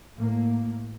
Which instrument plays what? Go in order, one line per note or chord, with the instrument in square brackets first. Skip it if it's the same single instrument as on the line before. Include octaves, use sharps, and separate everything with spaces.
[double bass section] A2 A#3